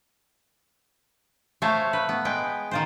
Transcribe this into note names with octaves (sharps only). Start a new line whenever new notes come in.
A3 C5 C#5 F5
B4
B3
G#3 B4 G5
D#3 F4 C5